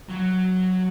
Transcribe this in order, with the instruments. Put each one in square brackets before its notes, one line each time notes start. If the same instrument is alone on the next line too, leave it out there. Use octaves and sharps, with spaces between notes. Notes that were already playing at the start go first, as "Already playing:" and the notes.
[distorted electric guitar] F#3 F#4